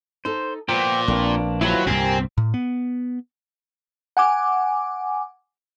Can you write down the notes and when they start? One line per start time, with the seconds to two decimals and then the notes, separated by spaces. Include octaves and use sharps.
0.25 D#4 A4 C5
0.69 A#2 F3 B3 G5
1.08 A#1 A#3 C4 D4 B4
1.61 D#2 F#3 E4 F4 B4 C5 A5
1.87 C2 G2 A#2 C4 G4 A#4 G#5
2.38 A2
2.54 B3
4.17 F#5 G#5 D6